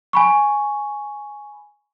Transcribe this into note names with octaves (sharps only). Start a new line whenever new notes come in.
G#5 B5 C#6